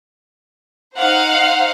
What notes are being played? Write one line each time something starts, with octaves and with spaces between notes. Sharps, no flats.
D#4 C5 F5 F#5